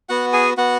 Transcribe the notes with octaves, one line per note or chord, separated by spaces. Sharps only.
B3 F#4 F#5
G#4 G#5
B3 F#4 F#5